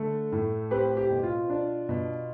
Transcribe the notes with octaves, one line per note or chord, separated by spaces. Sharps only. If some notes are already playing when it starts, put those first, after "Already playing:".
Already playing: D3 A3
A2
C4 G4 B4
G4
B2
F4
D4
B2